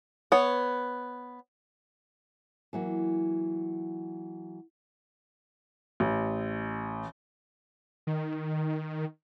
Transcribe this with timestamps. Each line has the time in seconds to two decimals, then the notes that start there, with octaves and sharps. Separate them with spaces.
0.32 B3 C#5
2.73 E3 F#3 A#3
6.00 A1
8.07 D#3